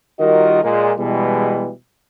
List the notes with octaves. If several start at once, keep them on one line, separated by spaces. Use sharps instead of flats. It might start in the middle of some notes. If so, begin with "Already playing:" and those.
D#3 G3 F4 F#4 A#4 D#5
A#2 G#3
B2 E3 G3 G#3